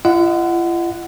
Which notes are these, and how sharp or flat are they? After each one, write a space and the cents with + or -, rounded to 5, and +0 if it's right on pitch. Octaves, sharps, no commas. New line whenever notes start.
F4 -45 D#5 +0 F#5 +0